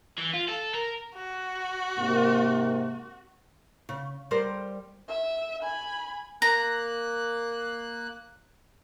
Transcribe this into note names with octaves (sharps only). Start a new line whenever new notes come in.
E3
F4
A4
A#4
F#4
G#2 C3 A#3
C#3
G3 A#4 C5
E5
G#5 B5
A#3 A#5 F#6